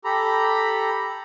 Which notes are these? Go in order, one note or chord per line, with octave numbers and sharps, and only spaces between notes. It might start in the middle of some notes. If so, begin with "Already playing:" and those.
G4 A4 A#5 B5